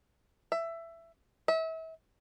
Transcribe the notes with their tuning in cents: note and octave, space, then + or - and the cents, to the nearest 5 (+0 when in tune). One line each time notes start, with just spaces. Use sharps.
E5 +15
E5 -35